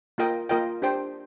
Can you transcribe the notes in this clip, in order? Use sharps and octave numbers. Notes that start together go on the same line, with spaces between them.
A#3 F4 A#4 D#5 G5
A#3 F4 A#4 D#5 G5
D4 G4 C5 G5